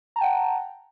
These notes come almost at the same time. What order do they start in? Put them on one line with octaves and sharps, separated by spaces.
A#5 A5 G5 F#5